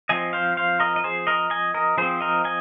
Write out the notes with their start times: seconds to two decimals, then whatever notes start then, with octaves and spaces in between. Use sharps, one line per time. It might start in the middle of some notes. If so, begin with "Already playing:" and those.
0.09 F3 C4 D#5 G#5
0.33 C5 F5
0.57 C5 F5
0.80 A#4 D#5
0.96 D#5
1.04 G#4 C5
1.27 A#4 D#5
1.50 D#5 G#5
1.74 A#4 D#5
1.98 F3 C4 G#4 C5
2.21 A#4 D#5
2.45 D#5 G#5